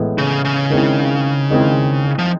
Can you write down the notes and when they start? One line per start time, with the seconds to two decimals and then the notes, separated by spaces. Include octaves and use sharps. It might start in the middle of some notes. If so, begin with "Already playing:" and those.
Already playing: A2 E3 G#3 B3
0.18 C#3
0.45 C#3
0.70 D#3 G#3 C4 E4
1.50 D#3 G#3 C4 E4
2.19 F3